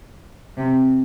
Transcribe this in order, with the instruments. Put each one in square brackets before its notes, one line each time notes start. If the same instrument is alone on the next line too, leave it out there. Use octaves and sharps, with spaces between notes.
[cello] C3